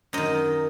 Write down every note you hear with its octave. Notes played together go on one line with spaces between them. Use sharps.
F#2 D#3 D#5